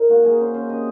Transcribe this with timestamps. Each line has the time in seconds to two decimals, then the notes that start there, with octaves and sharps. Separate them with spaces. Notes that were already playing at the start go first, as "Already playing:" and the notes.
Already playing: D#4 A#4
0.09 A#3 F#4
0.24 A#3 G#4
0.39 C#4 C5
0.54 C#4 C5
0.69 C3 D#5